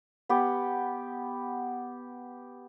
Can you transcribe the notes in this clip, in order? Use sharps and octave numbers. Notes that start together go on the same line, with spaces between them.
B3 G4 F#5